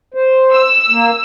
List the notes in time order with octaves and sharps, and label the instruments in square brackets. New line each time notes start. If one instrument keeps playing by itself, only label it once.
[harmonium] C5
[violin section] E6
[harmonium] A#3